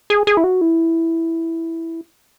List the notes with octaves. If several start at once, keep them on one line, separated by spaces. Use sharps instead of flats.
G#4
G#4
E4
F#4
E4